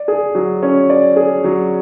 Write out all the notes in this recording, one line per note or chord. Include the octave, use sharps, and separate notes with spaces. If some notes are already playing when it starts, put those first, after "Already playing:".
Already playing: D5
G#4
F#3
C#4
D5
G#4
F#3